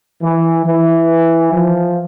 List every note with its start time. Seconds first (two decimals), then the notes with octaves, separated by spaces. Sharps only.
0.22 E3
0.66 E3
1.53 F3